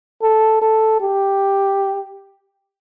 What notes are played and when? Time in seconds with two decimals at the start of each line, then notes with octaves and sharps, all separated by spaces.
0.22 A4
0.62 A4
1.01 G4